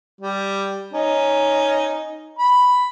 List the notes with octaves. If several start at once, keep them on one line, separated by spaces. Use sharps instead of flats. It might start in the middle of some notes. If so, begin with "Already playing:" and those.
G3
C#4 D#4
B5